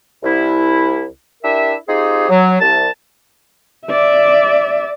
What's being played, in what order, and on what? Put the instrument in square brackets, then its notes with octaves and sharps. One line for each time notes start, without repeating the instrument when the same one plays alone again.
[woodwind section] C2 E4
D4 E4 G4 A#4 E5
C4 D#4 F4 G4 G#4
F#3
C2 A5
[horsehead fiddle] D5 E5